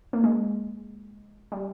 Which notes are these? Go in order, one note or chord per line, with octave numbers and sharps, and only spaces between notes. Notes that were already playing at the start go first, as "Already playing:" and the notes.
A#3
G#3
G3